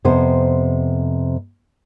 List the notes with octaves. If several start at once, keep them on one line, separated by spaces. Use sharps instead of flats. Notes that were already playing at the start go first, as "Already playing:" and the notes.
F2 C3 B3 C5